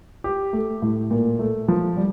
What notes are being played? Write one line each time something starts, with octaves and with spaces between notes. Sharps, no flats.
G4
A3
A2
A#2
A3
F3
G3